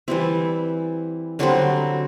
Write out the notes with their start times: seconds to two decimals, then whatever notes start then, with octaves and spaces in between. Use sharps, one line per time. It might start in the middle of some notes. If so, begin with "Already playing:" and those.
0.08 E3 G3 C4 E4
1.39 D3 F#3 G3 C4 F#4